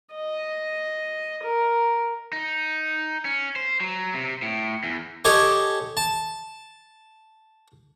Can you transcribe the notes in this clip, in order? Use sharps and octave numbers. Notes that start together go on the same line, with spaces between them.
D#5
A#4
D#4
C#4
C5
F#3
C3
A2
E2
G4 A4 C#5 D#5 G#5 D6
A5